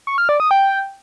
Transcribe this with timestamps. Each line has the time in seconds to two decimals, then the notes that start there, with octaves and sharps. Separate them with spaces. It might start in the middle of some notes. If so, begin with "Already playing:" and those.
0.07 C#6
0.18 F6
0.29 D5
0.40 D#6
0.51 G5